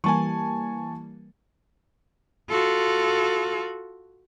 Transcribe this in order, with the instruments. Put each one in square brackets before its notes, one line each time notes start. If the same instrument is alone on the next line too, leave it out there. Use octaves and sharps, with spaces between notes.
[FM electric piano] E3 G3 A#3 [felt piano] G#5 A5 C#6
[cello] F4 A4 [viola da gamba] F#4